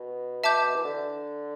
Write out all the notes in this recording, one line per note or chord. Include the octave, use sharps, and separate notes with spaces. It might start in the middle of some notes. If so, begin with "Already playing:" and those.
Already playing: B2
E5 A5 D6 G6
E3
D3